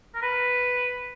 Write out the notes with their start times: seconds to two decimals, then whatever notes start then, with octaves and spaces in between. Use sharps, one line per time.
0.15 A#4
0.23 B4